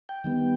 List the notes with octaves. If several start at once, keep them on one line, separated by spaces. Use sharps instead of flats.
G5
D#3 G3 B3